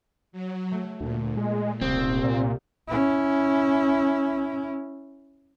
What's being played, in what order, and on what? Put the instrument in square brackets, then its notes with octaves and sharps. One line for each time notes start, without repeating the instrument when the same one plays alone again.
[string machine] F#3
[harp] A3
[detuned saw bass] D2 [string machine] A#2
[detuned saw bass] G#3
[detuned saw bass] D#1 [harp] C2 [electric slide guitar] C4
[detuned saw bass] A#2
[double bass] C#4 E4